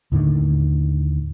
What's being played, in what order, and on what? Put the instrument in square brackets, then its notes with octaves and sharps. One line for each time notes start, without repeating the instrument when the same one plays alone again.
[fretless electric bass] D#2 A2 D3 D#3